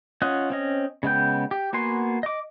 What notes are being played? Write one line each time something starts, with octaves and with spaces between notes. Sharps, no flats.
C#4 F4 D#5 F#5
C4 C#4 D#5
C#3 G#3 B3 G5
G4
A#3 B3 F#4 G#5 C6
D#5 D6